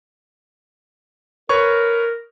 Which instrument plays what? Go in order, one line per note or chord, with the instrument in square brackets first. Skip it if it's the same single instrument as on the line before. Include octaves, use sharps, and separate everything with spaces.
[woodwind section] A#4 [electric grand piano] B4 C#5 C#6